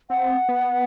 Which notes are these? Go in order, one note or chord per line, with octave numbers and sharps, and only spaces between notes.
C4 F#5
B3